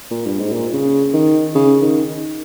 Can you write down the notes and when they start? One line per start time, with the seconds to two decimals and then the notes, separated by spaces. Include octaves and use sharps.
0.11 A#2
0.26 G2
0.39 G#2
0.52 A#2
0.73 C#3
1.14 D#3
1.55 C#3
1.82 D#3